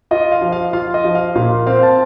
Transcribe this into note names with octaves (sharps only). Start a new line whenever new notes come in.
F4 D#5
F5
F3
F5
F4 F5
D#5
F3
F5
A#2 F5
C4 F5
A5